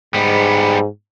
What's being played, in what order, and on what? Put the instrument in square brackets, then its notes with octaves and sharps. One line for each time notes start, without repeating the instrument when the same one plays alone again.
[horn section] G#2 [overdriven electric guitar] G3 B3